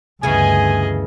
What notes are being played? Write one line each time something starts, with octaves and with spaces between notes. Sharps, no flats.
D2 G2 C#3 E3 B3 G#4 D#5 G#5